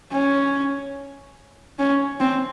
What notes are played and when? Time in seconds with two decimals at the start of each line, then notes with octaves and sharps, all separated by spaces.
0.12 C#4
1.79 C#4
2.20 C4